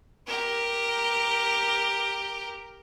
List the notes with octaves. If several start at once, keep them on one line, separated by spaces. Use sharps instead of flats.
G4 A#4